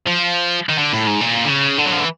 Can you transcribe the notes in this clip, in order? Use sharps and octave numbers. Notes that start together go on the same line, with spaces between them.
F3
D#3
D3
A2
G#2
A#2
D3
C#3
D3
F#3
F3
E3